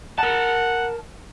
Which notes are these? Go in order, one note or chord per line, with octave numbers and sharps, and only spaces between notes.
A#4 F#5 A5